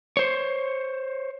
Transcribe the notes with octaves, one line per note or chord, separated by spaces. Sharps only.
C5 C#5